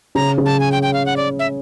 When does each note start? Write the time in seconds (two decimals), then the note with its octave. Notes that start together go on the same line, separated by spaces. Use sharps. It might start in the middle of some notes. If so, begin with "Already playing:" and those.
0.15 C#3 C#4 A#5
0.38 C#3 C#4
0.46 A5
0.60 G#5
0.72 G5
0.83 G5
0.93 F5
1.06 F#5
1.17 D5
1.39 E5